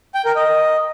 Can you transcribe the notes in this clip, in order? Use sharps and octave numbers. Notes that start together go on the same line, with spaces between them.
G5
A#4
D#5